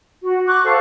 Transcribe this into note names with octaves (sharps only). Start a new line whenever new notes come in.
F#4
C#6 D6 F#6
A4 C5 F5